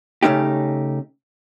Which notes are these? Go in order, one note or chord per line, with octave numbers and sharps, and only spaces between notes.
C#3 A3 C#4 D#4 G4